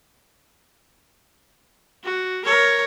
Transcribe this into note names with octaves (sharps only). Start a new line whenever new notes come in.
F#4
A#4 C#5